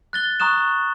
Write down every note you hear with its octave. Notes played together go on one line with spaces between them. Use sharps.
F#6 A6 G7
A#5 C#6 D#6 F#6 E7